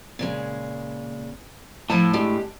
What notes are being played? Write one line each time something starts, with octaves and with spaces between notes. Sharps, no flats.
A#2 C#3 G#3
A2 F3 E4 A5
G#3 D4 G4